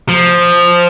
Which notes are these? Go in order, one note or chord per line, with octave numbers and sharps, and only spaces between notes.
F3